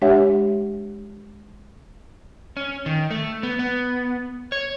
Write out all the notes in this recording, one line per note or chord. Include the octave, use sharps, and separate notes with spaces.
G#3 D4 G4 C#5 E5 F#5
C#4
D#3
A3
B3
B3
C#5